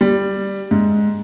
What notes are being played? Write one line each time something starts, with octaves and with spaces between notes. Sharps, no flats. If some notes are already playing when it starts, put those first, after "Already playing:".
G3
G#2